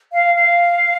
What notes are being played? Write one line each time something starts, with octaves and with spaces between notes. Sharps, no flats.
F5
F5